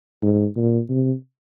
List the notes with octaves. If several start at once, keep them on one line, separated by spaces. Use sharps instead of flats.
G#2
A#2
C3